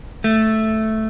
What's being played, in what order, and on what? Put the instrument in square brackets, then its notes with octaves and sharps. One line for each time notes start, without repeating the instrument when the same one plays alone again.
[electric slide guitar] A3